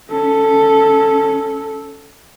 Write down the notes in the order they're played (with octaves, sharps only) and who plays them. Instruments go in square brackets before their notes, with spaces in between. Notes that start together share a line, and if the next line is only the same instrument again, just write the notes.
[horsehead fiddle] C#4 A4